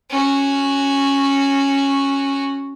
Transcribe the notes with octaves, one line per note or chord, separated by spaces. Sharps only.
C#4 F#4